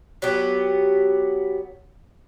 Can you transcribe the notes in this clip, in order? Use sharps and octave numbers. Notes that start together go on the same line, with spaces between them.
F#3 B3 G4